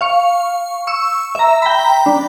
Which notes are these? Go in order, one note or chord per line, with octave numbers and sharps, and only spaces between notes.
F5 C#6
C#6 E6
E5 A#5
G5 A#5 B5
D4